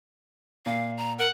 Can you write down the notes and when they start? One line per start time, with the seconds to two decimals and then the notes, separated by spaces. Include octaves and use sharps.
0.66 A#2 F5
0.97 A#5
1.19 A#4 F#5